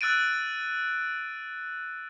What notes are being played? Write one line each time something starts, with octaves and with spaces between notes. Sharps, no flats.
E6 F#6 A6 D7 D#7